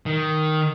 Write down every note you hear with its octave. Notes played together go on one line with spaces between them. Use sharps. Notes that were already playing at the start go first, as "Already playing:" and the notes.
D#3